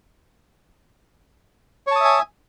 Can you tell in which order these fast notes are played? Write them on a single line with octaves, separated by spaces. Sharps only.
C#5 A5 D#6 E5 G#5